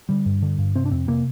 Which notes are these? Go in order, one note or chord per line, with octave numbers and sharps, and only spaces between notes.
D3 G3
G2
D3
G2
C3 C4
D4
F2 C4
C3 A#3